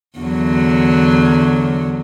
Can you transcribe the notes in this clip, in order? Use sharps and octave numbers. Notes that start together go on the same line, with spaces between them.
E2 D3 F#3